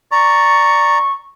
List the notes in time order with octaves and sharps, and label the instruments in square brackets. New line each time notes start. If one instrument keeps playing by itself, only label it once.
[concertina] D5 A#5 [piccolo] C#6